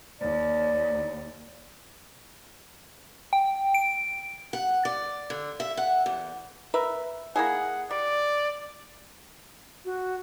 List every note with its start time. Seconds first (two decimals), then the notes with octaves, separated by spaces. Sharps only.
0.21 D#2 D5
3.33 G5
3.74 D7
4.53 F#5
4.85 D5
5.30 D3
5.60 E5
5.77 F#5
6.06 E2
6.74 A#4 B4 E5
7.36 A#3 E4 G#4 F#5
7.91 G3 D5
9.85 F#4